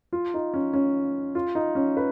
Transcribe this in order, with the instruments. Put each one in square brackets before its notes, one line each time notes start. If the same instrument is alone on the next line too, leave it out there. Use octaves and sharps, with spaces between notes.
[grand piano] F4
D#4
C#4
C#4
F4
D#4
C#4
B4